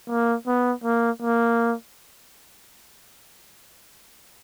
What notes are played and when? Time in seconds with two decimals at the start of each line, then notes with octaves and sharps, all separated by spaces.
0.10 A#3
0.47 B3
0.84 A#3
1.22 A#3